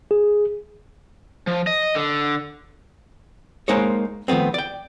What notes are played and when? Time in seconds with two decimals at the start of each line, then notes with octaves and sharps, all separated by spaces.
0.11 G#4
1.47 F3
1.67 D#5
1.95 D3
3.68 G#3 A#3 D#4 C5 C#5
4.28 D#3 F3 A3 B3 C4
4.54 D5 G5